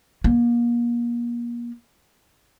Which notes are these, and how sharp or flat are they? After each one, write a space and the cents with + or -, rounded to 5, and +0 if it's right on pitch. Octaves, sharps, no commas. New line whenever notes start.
A#3 +35